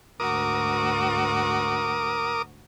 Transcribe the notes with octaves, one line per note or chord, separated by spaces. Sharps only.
D2 G#2 F#4 A#4 D6 D#6